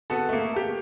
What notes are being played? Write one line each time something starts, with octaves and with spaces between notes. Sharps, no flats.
B3 F#4 A4
A3 A#3
G4